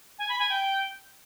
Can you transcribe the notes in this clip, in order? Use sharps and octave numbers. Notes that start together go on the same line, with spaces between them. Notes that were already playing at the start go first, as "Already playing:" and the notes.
G#5
B5
G#5
G5